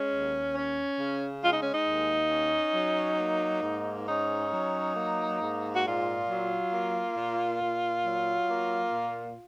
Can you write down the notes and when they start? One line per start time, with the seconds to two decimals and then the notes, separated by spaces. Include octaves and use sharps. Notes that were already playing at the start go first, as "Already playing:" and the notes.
Already playing: G#3 C#4
0.11 D#2
0.55 C#4
0.99 C#3
1.42 G#3 F4
1.52 D#4
1.62 C#4
1.72 D#4
1.86 D#2
2.31 C#4
2.74 F#3
3.20 A#3
3.63 G#2
4.08 C#4 D#4
4.52 F#3
4.96 A#3
5.40 G#2
5.73 F#4
5.84 A#2 F4
6.28 F#3
6.72 A#3
7.17 A#2
7.60 A#2
8.05 F#3
8.49 A#3
8.93 A#2